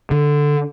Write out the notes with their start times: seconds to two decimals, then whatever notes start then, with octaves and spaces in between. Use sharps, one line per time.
0.11 D3